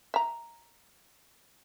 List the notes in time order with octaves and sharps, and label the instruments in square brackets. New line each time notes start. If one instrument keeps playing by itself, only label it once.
[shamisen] E5 A#5